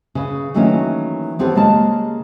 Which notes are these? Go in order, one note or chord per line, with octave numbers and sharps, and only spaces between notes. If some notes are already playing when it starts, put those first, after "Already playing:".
C#3 B4
D#3 E3 F#3 A3 A#3 C#4
B3 C4 G4 A4 B4 C#5
C#3 G#3 A#3 G4 A5